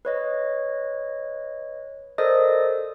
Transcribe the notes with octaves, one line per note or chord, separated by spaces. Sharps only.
B4 C#5 D#5
A4 A#4 C5 D5 D#5 D#6